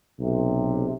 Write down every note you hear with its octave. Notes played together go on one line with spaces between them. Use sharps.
B1 C3